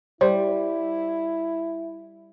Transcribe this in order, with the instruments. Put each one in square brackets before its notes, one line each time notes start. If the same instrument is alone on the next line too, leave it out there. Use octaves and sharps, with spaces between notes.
[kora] G3 [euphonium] E4 [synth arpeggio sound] C5